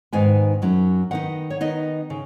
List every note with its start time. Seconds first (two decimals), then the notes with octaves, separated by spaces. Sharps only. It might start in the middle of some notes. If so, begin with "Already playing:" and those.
0.13 G#2 D#3 B3 D#4 G#5
0.62 F#2 F#3 C#4
1.11 D#3 B3 D#4 F#5
1.50 C#5
1.61 D#3 B3 D#4 D#5
2.10 C#3